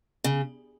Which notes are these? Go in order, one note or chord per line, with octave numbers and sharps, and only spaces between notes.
C#3